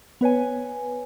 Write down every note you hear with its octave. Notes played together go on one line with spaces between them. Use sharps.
B3 B4 C#5 G#5